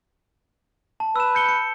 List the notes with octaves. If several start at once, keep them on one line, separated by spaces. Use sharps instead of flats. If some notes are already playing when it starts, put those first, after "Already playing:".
A5
B4 E6 E7
G6 C#7 G7
C#7